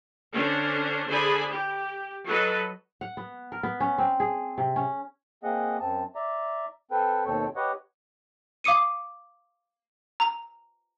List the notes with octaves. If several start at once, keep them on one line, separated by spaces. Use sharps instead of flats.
D3 C#4 D4 C5
D3 G#4 C5 D5 G#5 B5
G4
F#3 A4 B4 D#5
F#5
B3
A#4
B3
C#4
C4
G#4
C3
C#4
A#3 C4 G#4 D#5 F#5
F#2 C4 A5
D5 E5 A#5
C4 A4 B4 G5
D#2 B2 C4 A4 C#5 G5
G4 B4 C#5 D#5 F#5
F5 D6 D#6 C#7 D#7
A#5